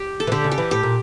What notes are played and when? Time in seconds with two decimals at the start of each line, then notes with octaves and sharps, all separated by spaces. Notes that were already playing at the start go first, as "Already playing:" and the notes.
Already playing: G4
0.20 A4
0.27 E3
0.32 D3 G4
0.44 C#3
0.51 G4
0.58 E3
0.71 A2 G4
0.83 A#2